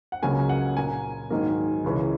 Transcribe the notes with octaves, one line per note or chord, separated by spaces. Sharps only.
F#5
C#2 C#3 F#3 A#3 G#5
F#5
A#2 A#3 G#5
G#2 D#3 F#3 A#3
C#2 C#3 E3